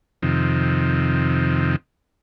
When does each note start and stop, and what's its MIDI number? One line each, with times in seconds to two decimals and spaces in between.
0.22 1.76 41
0.22 1.76 48
0.22 1.76 51